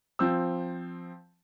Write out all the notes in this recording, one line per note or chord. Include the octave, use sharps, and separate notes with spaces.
F3 C4 E6